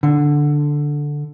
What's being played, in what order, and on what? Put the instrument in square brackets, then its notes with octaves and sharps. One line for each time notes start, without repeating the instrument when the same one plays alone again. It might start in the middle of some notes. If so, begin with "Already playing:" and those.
[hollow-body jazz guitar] D3